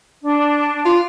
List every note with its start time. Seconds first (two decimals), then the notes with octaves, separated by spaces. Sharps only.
0.24 D4
0.85 F4